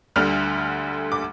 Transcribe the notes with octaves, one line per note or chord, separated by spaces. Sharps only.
D2 D3 G3 F6
D6